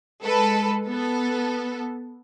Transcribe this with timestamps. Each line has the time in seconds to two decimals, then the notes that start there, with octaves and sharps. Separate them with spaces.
0.23 G#3 A4 B4
0.88 B3 A4